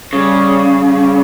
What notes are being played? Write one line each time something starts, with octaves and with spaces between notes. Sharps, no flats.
C#3 G3
G3